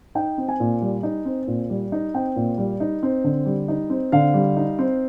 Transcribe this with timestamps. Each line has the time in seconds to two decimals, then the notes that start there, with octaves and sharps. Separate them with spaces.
0.15 D#4 G5
0.38 C4
0.49 G#5
0.60 A#2
0.82 G3
1.03 D#4
1.25 C4
1.47 A#2
1.70 G3
1.92 D#4
2.14 C4 G5
2.36 A#2
2.58 G3
2.80 D#4
3.03 C4
3.24 D3
3.46 G3
3.68 D#4
3.90 C4
4.12 D3 F5
4.34 G3
4.56 D#4
4.79 C4